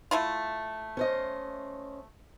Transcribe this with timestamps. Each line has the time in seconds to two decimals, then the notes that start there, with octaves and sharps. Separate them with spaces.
0.11 A3 E4 F4
0.97 C#4 C5 D#5